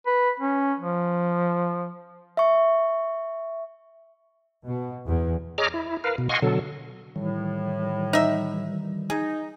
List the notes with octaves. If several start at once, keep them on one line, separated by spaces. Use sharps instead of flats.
B4
C#4
F3
E5 C#6
B2
E2
G#4 C#5 D#5 A#5 D6 F6
E4
A#4 B4 F5
B2
D#5 F5 F#5 G#5 C6 C#6
B2 D3 F#3 A4
A2 D#3 E3 G3
D#4 E5
D#4 G#4